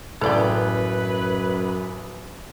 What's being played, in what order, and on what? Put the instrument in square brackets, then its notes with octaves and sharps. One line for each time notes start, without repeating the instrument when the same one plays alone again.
[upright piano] A1 [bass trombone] F#2 [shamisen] A4 D5 G5 [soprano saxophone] B4